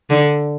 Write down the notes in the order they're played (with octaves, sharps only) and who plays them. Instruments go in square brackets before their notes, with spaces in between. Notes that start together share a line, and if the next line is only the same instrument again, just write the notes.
[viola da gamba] D3